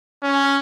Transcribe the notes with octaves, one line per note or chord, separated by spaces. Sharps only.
C#4